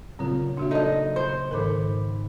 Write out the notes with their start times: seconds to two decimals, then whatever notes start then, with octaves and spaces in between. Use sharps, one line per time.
0.19 A#2 C#3 F#3 C4 F4
0.57 A#3 D4 F#4 G4 E5 D#7
0.71 D#4 A4 D5 D#5 A5
1.16 C5 D#6
1.51 G#2 D#3 A4 A#4 B5 C#7